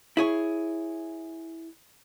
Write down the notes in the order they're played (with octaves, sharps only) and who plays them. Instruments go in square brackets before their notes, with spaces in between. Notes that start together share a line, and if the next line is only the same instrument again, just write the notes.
[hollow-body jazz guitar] E4 G#4 C#5